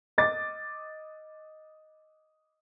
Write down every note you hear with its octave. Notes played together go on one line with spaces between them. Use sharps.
D#5 D6 A6